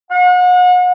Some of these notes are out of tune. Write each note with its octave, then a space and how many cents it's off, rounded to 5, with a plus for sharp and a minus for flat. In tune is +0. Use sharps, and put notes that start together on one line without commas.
F#5 -40